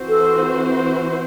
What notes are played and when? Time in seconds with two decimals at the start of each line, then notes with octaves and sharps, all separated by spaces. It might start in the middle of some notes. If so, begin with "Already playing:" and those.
Already playing: E3 C4 F#4 C5
0.09 A4